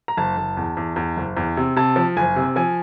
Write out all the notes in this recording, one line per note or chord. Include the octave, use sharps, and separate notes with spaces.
A#5
F#1 A5
F#1
E2
E2
E2
F#1
E2
C3
C3 A5
F3
F#1 G#5
C3
F3 G#5